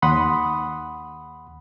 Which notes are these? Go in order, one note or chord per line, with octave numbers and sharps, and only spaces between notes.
D#2 F#5 B5 C6 D#6